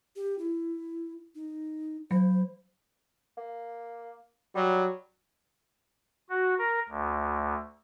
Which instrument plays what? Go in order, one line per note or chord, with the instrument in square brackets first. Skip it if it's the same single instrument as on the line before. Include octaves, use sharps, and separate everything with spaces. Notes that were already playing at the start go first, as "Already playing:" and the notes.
[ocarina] G4
E4
D#4
[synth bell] F#3 [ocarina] C5
[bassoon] A#3
[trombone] F#3 [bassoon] G3
[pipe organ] F#4
A#4
D2